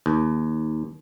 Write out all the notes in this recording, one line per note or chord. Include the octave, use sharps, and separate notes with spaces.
D#2